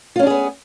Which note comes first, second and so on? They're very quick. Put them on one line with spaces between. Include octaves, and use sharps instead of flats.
F4 C#4 D4 G#4 B3